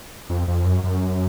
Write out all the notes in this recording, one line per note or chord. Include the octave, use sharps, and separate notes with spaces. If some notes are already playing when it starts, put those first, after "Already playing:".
F2
F2
F#2
F#2